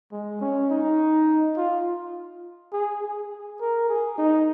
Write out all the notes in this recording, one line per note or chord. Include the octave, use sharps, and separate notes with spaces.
G#3
C#4
D#4
F4
G#4
G#4
A#4
G#4
D#4